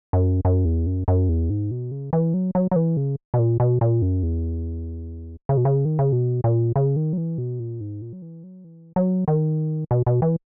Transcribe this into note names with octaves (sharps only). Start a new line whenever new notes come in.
F#2
F#2
E2
F#2
F#2
E2
G#2
B2
C#3
E3
F#3
F#3
F#3
E3
C#3
B2
A#2
B2
A#2
F#2
E2
C#3
B2
C#3
D#3
C#3
B2
A#2
C#3
D#3
F#3
E3
B2
A#2
G#2
A#2
F#3
E3
F#3
E3
F#3
D#3
B2
B2
E3